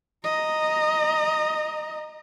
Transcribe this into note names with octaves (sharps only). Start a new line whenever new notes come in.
D#5 A#5